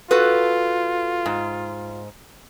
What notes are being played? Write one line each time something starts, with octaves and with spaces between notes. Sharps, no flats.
F4 F#4 A4 B4
G#2